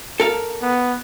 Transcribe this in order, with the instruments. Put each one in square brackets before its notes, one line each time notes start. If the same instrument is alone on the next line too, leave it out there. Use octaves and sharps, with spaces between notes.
[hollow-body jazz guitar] A4 A#4 F5
[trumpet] B3